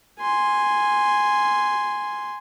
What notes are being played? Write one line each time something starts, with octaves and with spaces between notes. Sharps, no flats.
G#5 C6